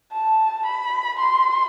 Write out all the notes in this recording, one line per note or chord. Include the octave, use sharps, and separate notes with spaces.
A5
B5
C6